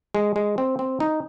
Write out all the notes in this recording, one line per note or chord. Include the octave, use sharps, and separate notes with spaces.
G#3
G#3
C4
C4
D#4